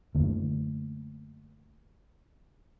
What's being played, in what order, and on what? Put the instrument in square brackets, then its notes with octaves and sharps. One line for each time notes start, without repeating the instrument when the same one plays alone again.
[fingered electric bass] F#2 D3 A3 A#3